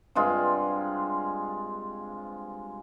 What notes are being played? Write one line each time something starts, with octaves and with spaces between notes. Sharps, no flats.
G2 C3 G#3 F4